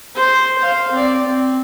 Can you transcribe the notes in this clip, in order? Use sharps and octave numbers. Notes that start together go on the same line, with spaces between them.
C5
C5 F5
C4 D5
C4